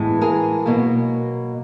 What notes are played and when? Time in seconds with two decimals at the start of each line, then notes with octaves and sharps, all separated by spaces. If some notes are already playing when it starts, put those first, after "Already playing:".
Already playing: A2 E3 G#3 B3
0.21 G#4 A#4
0.66 B2 F#3 A#3